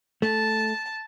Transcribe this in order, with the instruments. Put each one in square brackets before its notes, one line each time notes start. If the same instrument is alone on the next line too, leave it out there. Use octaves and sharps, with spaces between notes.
[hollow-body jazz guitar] A3 [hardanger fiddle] A5